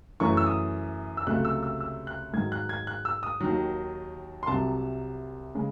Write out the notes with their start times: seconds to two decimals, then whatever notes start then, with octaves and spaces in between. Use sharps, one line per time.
0.20 F#2 E3 A3 C#6
0.37 E6
0.46 D#6
1.17 E6
1.27 C#2 C3 F#3 A3 F#6
1.45 E6
1.63 E6
1.80 E6
2.07 F#6
2.33 G#2 D#3 F#3 G#6
2.52 F#6
2.69 G#6
2.87 F#6
3.05 E6
3.23 D#6
3.41 D#2 D#3 F#3
4.43 C6
4.47 C2 C3 F#3 A5
5.55 C#3 G#3